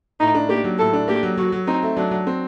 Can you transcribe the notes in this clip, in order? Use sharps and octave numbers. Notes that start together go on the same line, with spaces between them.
A2 D#4
D4
A#3 G4
F#3
A2 A4
D4
A#3 G4
F#3
F#3 F#4
F#3
C4 D#4
A3
F#3 D4
F#3
C4